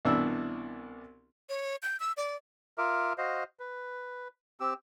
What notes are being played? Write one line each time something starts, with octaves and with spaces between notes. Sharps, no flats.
C2 B2 E3 D4 E4 E6
C#5
G6
E6
D5
F4 A#4 E5 D6
F#4 C5 D#5 F5
B4
C4 G4 E6